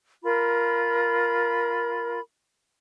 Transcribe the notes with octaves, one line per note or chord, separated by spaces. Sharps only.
F4 A#4 B5